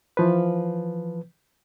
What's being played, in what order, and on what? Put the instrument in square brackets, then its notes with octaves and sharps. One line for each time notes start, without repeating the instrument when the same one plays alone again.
[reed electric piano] E3 F3 B4